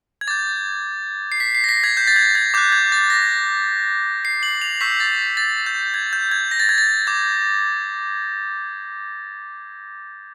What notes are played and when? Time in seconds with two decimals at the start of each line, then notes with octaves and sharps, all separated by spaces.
0.21 G#6
0.28 D6 G6 A6
1.32 C7
1.40 B6
1.55 C7
1.64 A#6
1.69 B6
1.84 G#6
1.97 G6
2.07 A6
2.16 G#6
2.35 G#6
2.54 D6 F#6 G6
2.72 G#6
2.92 A6
3.10 A#6
4.25 C7
4.43 F#7
4.61 F7
4.81 C#6 E6 G6 B6
5.00 A6
5.37 A6
5.66 G6
5.94 G#6
6.13 G6
6.31 G#6
6.51 A#6
6.60 A6
6.69 G#6
6.78 A6
7.07 D6 G6